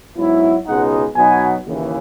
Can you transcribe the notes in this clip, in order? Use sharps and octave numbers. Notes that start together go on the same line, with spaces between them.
G#2 F#3 B3 E4
C#2 B2 G#3 D#4 F#5
B2 F#3 B3 D#4 G#5
D#2 C#3 E3